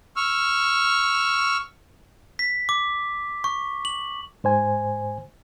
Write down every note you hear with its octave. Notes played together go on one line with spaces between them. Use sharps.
C#6 E6 F6
B6
D6
C#6
F#7
G#2 C5 G#5